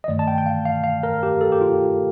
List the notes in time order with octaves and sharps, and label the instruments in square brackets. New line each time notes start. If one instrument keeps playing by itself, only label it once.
[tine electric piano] D#5
G2 D#3 A3 D5
A5
G5
G5
F5
F5
F5
A#4
G4
A4
G4
F4